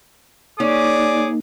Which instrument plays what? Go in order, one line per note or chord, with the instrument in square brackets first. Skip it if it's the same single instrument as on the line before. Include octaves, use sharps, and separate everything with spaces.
[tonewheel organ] A#3 D#4 [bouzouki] C#4 [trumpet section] G#4 D6 [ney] D5